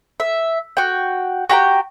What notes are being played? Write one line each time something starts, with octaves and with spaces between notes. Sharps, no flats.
E5
F#4 G5
F#4 G4 G5 A#5